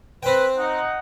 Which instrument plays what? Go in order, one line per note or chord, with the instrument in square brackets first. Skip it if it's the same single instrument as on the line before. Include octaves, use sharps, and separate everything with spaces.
[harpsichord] C4 G5 [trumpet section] B4
[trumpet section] D#4 F#5